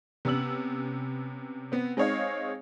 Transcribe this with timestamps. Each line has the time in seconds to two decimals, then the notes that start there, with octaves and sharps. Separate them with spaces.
0.25 C3 B3 C#4 E6 F#7
1.72 B3 C4
1.97 G#3 C4 D#4 C#5 D#5 F5